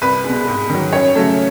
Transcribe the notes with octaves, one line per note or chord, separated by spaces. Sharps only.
C2 B4
G#3
B2
G#2
D#3 F#3
F#2 C#5
C#3 F#3 A3